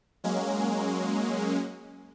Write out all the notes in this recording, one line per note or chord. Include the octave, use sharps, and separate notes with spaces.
F#3 G#3 A#3 C#4